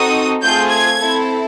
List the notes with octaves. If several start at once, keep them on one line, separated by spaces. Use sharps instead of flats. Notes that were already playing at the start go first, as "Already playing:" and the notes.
Already playing: C4 D#4 F#4 A4 D#6
A3 C4 F4 G#4 G6
G#6
C4 E4 A4